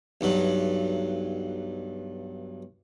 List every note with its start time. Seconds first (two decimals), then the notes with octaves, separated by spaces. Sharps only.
0.21 B1 G2 F#3